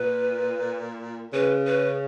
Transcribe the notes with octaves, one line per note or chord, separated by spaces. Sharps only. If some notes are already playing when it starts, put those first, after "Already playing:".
Already playing: A#2 B4
C#3 B4
B4